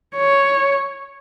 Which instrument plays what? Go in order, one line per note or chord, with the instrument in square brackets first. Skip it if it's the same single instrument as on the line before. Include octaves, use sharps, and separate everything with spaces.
[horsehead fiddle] C#5